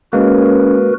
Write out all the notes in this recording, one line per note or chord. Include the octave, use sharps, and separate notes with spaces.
G#3 A#3 C#4 F#4 A#4 B4